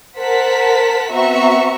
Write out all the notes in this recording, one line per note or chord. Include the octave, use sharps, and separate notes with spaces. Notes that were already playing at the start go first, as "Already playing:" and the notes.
A#4 C5 F#5 A5 B6
B3 C4 F#4 E5 A#5 C#6